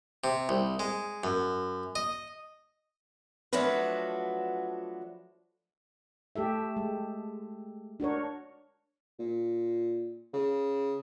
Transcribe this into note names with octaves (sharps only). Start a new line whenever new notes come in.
C3
C2
G#3
F#2
D#5
F3 F#3 A3 D4 F#4 B4
A3 G4 A4 E5
G#3
D4 F#4 A#4 C#5
A#2
C#3